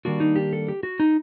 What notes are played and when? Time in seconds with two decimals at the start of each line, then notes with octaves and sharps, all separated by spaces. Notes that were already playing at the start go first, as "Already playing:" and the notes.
0.05 D#3 G3 A#3 D4 F#4
0.20 D#4
0.36 G4
0.53 A4
0.68 G4
0.83 F#4
1.00 D#4